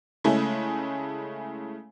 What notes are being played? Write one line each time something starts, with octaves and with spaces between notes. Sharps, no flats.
C#3 G#3 A3 E4